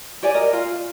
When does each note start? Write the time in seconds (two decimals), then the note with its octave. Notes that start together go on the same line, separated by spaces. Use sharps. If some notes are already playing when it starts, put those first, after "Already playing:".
0.22 G4 C#5 D5 G#5
0.34 A#4 D#5
0.53 F4